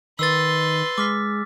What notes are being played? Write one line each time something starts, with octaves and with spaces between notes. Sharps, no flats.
D#3 B4 C6 E6 A6
G#3 D6 F6 B6